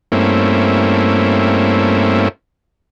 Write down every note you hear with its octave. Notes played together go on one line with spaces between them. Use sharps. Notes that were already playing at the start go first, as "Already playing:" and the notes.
G2 A3 A#3 C4 C#4 E4